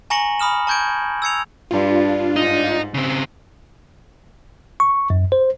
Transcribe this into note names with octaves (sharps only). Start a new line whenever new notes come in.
G#5 A#5 C#6 A#6 C#7 F#7
B5 D#6 F6 E7
A5 C#6 G6 G#6 D7
E6 G#6 C#7 F7
G2 D4 F4
G#2 D#4
C#3 C4
C#6
F#2
C5